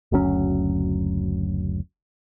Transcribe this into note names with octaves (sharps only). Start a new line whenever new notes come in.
F#1 D2 F#3 C#4